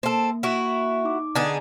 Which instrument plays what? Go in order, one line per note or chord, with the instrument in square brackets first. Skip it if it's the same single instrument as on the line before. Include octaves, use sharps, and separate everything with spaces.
[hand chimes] A#3 [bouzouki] C4 A4
[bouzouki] E4 F#4
[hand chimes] D#4 D6
[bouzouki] D3 B3 G#4 [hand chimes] D5 D#5 A#5